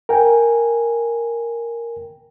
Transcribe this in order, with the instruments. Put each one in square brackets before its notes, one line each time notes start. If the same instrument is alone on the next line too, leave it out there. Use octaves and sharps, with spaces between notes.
[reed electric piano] A#4 G5 G#5